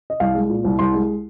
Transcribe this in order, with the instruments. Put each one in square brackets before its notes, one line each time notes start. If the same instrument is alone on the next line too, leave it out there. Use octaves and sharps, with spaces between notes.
[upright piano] D#5
C2 F5
G#3
A#2
C2
C2 C6
G#3